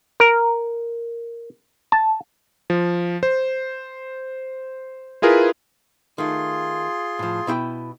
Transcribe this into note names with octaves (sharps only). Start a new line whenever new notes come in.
A#4
A5
F3
C5
E4 F4 G#4 A#4 B4
D#3 A3 F4 G#4 C6
A2 F3
B2 E4 G5